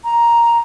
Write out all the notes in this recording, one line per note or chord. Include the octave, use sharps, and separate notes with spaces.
A#5